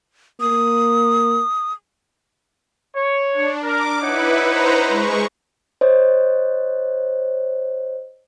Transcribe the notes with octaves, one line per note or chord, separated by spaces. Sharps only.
A#3 D#6
C#5
D4
A#4 D6
D#4 E4 B4 C#5 F#5
B4 C5 A#5
G#3 C#6
C5 C#5 D#5